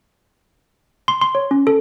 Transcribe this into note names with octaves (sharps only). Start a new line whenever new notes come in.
C6
C6
C#5
C#4
A4